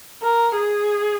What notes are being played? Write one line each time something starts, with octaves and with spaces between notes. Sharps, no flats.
A#4
G#4